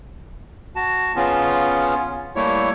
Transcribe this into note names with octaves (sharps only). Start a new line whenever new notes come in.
F#4 A5
C#3 B3 C#4 F4
G3 A3 A#3 E4 C#5